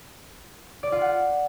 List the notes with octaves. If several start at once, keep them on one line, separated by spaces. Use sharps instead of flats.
D5
F4
F#5